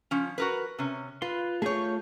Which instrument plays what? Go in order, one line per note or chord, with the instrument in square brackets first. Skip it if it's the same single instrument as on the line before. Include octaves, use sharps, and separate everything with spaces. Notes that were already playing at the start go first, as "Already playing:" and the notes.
[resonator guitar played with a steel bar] F3 C#4
F#4 A#4 B4
C3 C#4
[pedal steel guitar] F4 C6 [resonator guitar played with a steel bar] B4
[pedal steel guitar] A3 F4 G6 [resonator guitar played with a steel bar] G#4 C#5